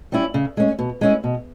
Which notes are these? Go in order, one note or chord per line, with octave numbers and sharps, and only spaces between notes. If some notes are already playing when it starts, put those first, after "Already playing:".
G3 C#4 E4
C#3
G#3 C#4
B2
G#3 C#4 E4
B2